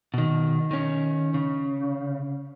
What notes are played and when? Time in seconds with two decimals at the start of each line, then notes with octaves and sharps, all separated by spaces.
0.14 B2 D#3
0.71 D#3 C#4
1.34 C#3